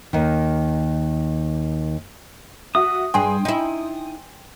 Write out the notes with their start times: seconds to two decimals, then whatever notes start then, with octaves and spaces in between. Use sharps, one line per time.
0.13 D#2 D#3
2.75 F#4 E5 D#6
3.14 G2 G#4 G5 G#5 C6
3.45 D#4 E4